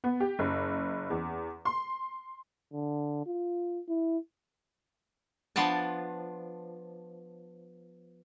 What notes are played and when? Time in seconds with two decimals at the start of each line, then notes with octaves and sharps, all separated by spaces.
0.04 B3
0.20 G4
0.39 F#1
1.10 E2
1.65 C6
2.73 D3
3.26 F4
3.88 E4
5.56 F3 B3 D4 A5